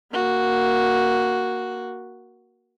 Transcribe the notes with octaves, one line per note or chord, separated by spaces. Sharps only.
A#3 F#4